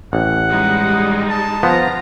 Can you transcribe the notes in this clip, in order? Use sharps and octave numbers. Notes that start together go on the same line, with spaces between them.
A1 F#5
G3 G#3 D#4
A5
F3 B3 F4 A#5